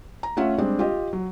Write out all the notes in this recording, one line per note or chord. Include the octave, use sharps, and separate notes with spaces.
A#5
A3 C#4 F4 E5 F#5
G3 G#3 C4 D4
F4 G4 D#5
F#3